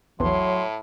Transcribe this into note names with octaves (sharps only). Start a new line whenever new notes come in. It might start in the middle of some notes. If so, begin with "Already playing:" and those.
A#1 E2 A2 E3 F#3 C6